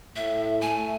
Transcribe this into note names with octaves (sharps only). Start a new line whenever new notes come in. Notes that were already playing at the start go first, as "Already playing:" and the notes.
A2 E5
A3 G#5